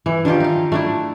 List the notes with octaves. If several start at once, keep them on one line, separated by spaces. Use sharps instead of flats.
E3
D3 D#3 F4 G4
D#4 F5
A3 D4 E4